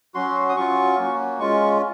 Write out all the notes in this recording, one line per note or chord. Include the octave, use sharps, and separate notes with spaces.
F#3 C#4 F#4 C6
D#6
F#3 C#4 F4 C#6
A#3 C#4 F#4
G#3 C#4 F4 C#6